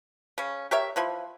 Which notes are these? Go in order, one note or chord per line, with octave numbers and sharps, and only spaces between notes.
C#3 C#4
G4 A#4 C#5 E5
E3 F3 E4